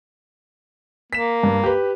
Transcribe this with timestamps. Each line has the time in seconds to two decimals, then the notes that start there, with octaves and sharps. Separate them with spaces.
1.13 A#3 B6 E7
1.43 G2
1.64 G4 B4